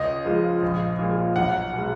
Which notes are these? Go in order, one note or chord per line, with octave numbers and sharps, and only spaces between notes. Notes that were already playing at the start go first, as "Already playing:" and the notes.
Already playing: C#2 D#5
C#3 F3 G#3
A#1
A#2 F3 G#3
B1 F#5
B2 G#3